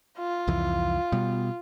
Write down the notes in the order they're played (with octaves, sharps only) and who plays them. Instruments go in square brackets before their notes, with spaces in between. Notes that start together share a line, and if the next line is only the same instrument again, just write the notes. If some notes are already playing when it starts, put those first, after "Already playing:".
[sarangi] F4
[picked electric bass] C2 F2 E3
B2 G3 B3